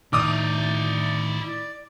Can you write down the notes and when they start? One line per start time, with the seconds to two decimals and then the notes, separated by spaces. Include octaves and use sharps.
0.13 A2 D#3 E4 D5 D#5 D6 D#6